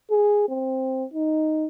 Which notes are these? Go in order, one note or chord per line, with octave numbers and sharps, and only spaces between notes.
G#4
C4
D#4